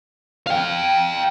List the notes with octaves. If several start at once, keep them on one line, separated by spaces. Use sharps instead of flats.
F5 G5